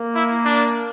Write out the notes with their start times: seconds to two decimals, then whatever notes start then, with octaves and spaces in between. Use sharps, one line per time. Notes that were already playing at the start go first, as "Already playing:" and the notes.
Already playing: A#3
0.15 E4
0.45 D4